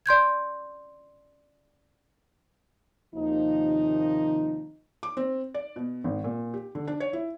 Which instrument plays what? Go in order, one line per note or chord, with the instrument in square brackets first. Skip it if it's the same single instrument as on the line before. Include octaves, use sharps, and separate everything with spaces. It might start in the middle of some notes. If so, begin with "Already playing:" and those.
[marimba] D5 C6 G6 G#6
[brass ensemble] D#2 C3 F3 D#4
[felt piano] D6
C4
D5
B2
G#1
A#2
G4
D3
D4
C#5
E4